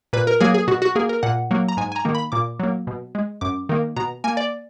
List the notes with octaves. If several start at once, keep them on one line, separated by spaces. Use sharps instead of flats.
A#2 B4
A#4
F#3 A#3 G#4
G#4
B2 F#4
F#4
A#3 G#4
A#4
A#2 F#5
F#3 A#3
A#5
G#2 G#5
G#5
A#5
D#3 A#3
B5
A#2 D6
F#3 A#3
B2
G#3
F#2 D6
D#3 A#3
B2 A#5
A#3 G#5
D5